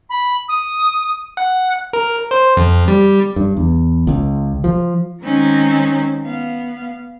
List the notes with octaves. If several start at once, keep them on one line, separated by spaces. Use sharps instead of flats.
B5
D#6
F#5
A#4
C5
F2
G3
G2
E2
C#2
F3
D#3 G#3 C4 C#4 D#4
B3 F5